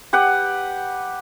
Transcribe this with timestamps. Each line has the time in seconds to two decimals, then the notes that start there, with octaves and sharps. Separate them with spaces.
0.13 G4 B4 F#5